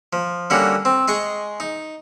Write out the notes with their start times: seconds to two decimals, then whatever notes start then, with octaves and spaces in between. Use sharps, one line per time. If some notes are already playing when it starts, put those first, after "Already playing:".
0.13 F3
0.50 D3 G3 A#3 C#4 F#4
0.85 C4
1.08 G#3 G#4 D#5 C#6
1.60 D#4